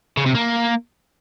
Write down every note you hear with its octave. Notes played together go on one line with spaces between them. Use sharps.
C#3
C3
A#3